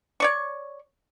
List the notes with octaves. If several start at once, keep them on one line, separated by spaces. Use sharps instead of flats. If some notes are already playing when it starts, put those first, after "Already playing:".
C#5 D5 C#6